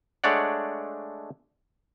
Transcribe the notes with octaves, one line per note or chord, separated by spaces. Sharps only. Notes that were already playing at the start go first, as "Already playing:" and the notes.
G#3 A3 D4 C#5 D5 F#5